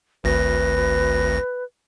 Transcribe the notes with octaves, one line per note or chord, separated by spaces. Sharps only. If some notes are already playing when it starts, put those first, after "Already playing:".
G#1 D2 B4 A#6